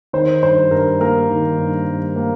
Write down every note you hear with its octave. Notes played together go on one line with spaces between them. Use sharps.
D#3 C5
G2 C5
G2 A#4
A#3 A#4
D#3
G2
G2
A#3